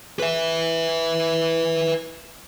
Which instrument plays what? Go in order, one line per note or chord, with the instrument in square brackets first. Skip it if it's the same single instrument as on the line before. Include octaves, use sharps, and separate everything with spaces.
[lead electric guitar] B4 E5